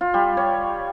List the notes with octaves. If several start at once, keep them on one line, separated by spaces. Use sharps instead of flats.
F4
G3
C#5